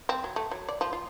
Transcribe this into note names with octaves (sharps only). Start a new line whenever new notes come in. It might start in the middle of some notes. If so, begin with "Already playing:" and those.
C4
F#3
A3
F#3
D5
F3
F4